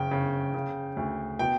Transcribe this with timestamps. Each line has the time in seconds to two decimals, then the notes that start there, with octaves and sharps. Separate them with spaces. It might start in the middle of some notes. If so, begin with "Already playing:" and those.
Already playing: F#1 C#3 G5
0.11 C#3
0.54 C#3
0.97 D2
1.39 B2 G5